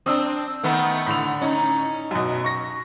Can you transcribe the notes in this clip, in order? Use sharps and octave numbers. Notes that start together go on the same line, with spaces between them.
C4 D4 D#6 E6
D#3 A3 B3
A2 D3 F7
C#4 D#4
F#2 B2
C#6 A#6